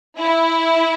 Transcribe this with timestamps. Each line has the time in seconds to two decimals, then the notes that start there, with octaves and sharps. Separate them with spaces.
0.17 E4